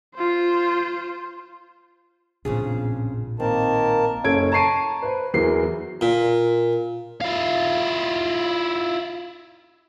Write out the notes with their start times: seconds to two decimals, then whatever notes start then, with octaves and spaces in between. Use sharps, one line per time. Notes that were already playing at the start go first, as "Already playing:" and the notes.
0.15 F4 C5
2.45 A#1 F2 A2 C#3 G#4
3.40 D#3 A#3 C4 A#4 A5
4.24 F#1 C#4 A4 G#6 D7
4.52 A5 A#5 C#6 C7 D7 D#7
5.03 B4 C5
5.34 E2 E3 F#3 A#4 C7
6.01 A#2
7.21 E4 F4